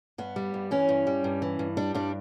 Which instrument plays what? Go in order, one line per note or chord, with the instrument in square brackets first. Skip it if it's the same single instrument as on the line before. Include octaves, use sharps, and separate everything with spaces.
[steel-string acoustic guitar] G2 B3
G3
G2
E3 C#4
G2
G3
G2
E3
G2
G3 D4
G2 D4